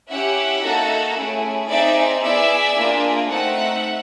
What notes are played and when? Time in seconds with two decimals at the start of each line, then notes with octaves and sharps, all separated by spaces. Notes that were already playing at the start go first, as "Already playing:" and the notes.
0.09 C#4 E4 G4 E5 F#5
0.63 A#3 D#4 F#4 A4
1.16 A3 C#4 E4 G#4
1.69 C4 D#4 G#4 D5 E5
2.23 B3 E4 G#4 D5 E5
2.77 A#3 D4 F4 G#4
3.29 A3 C4 D#4 E5 F#5